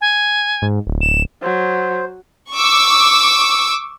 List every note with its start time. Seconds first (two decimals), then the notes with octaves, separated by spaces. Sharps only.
0.01 G#5
0.62 G#2
0.87 D1
1.01 E7
1.43 F#3 C5
2.52 C#6 D6 E6